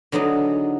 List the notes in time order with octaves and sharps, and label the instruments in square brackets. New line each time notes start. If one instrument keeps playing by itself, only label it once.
[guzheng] D3 F#3 B3 D#4 G#4